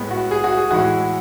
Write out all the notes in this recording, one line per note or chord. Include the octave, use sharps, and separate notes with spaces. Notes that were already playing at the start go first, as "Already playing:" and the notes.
Already playing: A2 G#3 B3
F#4
G#4
F#4
G#4
A2 E3 G#3 F#4